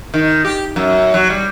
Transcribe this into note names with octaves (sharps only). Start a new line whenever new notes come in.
D#3
G4
F#2
F#3
G3